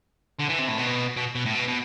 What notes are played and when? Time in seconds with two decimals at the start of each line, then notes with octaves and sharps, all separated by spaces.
0.39 D3
0.49 E3
0.58 C3
0.68 A2
0.78 B2
1.17 B2
1.35 B2
1.46 A2
1.55 B2
1.68 B2